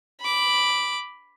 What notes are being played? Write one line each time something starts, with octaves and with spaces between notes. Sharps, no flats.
B5 D6